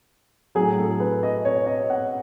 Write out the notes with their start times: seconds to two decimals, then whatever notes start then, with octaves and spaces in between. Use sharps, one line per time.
0.55 A2 F#3 G#4
0.79 A4
1.00 B4
1.23 D#5
1.45 C#5
1.66 D#5
1.90 F#5